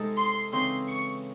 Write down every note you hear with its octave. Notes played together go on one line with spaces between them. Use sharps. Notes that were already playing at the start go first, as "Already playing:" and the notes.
Already playing: C3 G#3 D#4 A4
C6
C#3 E3 C4 D#4 C6
C#6